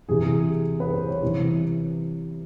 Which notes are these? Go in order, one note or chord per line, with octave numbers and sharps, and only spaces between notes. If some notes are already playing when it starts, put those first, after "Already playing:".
C3 E3 G#4
B4
C5
C#5
C3 E3